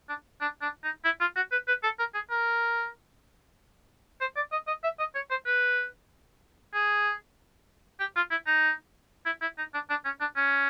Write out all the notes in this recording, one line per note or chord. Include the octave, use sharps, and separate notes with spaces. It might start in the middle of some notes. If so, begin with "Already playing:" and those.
D4
D4
D4
D#4
E4
F4
F#4
B4
B4
A4
A#4
G#4
A#4
C5
D5
D#5
D#5
E5
D#5
C#5
C5
B4
G#4
G4
F4
E4
D#4
E4
E4
D#4
D4
D4
C#4
D4
C#4